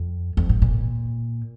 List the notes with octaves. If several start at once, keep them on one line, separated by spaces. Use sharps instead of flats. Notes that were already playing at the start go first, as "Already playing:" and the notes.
Already playing: F2
F2
A2
A#2